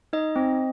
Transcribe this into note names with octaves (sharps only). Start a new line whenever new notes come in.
D#4 D#5
C4